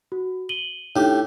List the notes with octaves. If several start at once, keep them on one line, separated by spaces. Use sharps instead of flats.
F#4
D#7 F#7 G7
A2 D4 D#4 G4